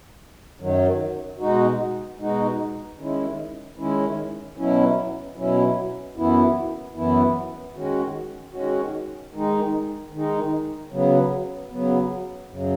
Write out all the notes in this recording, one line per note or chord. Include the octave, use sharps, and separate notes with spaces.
F#2 D#3 F#3
B2 G#3 D#4 F#4
B2 G#3 D#4 F#4
D#3 G#3 C#4 E4
D#3 G#3 C#4 E4
B2 F#3 C#4 E4
B2 F#3 C#4 E4
F#2 E3 B3 E4
F#2 E3 B3 E4
D#3 G#3 C#4 F#4
D#3 G#3 C#4 F#4
D#3 G#3 D#4
D#3 G#3 D#4
C#3 F#3 B3
C#3 F#3 B3
F#2 C#3 F#3